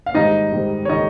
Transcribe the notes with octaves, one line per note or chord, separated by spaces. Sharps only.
F5
G#2 D#3 G3 D#4 D#5
G#2 D#3 G3
C#5
D#3 G3 D#4 D#5